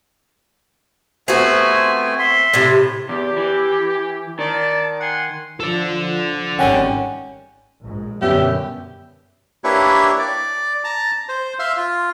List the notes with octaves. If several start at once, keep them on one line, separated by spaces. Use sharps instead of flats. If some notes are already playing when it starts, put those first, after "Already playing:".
A3 B3 C4 F#4 G#5
E5 C6
A2 C3
E2 G4
E3
D#3 D5 A5
F#5 G#5 C6
F3 A4 D5
G#1 D#3 G3 C#4 F#5 G5
A#1 G#2
F#2 B2 D3 G3 B3 C#4 G4 E5
A#3 D4 E4 G4 B4 C#5
D5
A5 A#5
C5
E5 F5 C6
F4